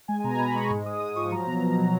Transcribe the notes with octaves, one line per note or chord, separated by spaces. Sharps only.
G#3 G#5
G#5
B2 A#5
B2 B5
G#3 C#6
G#2
G#3 D#6
G#2 D#6
F3 C#6
F#3 A#5
B2
B2
F#3